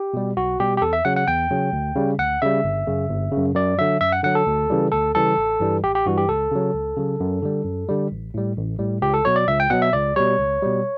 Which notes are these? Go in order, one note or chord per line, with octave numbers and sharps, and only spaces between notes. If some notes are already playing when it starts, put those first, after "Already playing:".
Already playing: G4
B2 G3
B1 F#4
B2 G3 G4
G4
E2 A4
E5
C#3 F#3 F#5
F#5
E2 G5
C#3 F#3
D2
C#3 G3
D2 F#5
C#3 G3 E5
G1
F#2 C#3
G1
F#2 C#3
F#2 D5
D3 F#3 E5
F#2 E5
F#5
D3 F#3 F#5
A4
D2
C#3 E3 G3
D2 A4
C#3 E3 G3 A4
A1
G2 E3 G3
A1 G4
G4
G2 E3 G3 F#4
G4
C#2 A4
C#3 F#3
C#2
C#3 F#3
F#2
D3 G3
F#2
D3 G3
A1
A2 G3
A1
A2 G3
C#2 G4
A4
B2 F#3 C#5
D5
C#2 E5
G5
B2 F#3 F#5
E5
C#2 D5
B2 G3 C#5
C#2
B2 G3